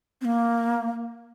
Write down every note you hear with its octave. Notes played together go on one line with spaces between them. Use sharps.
C4
A#3